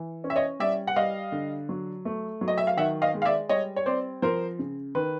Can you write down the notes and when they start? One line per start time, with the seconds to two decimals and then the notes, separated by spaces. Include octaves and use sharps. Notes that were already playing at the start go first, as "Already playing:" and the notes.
Already playing: E3
0.24 C#4
0.30 E5
0.36 C#5 D#5
0.60 G3 D5 E5
0.87 F#5
0.96 G3 D#5 F5
1.32 D3
1.69 F#3
2.05 A3
2.41 F#3
2.48 D#5
2.58 E5
2.67 F5
2.77 D#3 E5 F#5
3.02 D#5 F5
3.14 G#3
3.22 F5
3.25 D5 E5
3.49 G3 C#5 D#5
3.76 C#5
3.86 C4 C5 D5
4.22 F3 A#4 C5
4.59 C#3
4.95 D#3 B4